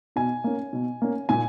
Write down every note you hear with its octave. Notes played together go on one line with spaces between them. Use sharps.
B2 G#5
A#3 C#4
B2
A#3 C#4
A#2 G#5